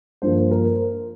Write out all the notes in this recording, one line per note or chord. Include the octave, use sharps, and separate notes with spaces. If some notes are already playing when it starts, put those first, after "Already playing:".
G2 F3 A#3 C5
C5
A#4